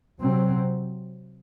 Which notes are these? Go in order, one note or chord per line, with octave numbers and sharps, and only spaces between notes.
C3 F#3 C4